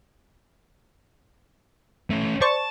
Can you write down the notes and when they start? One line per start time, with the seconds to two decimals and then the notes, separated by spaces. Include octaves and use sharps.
2.10 A3 C#4
2.41 C5 D5 A5 C#6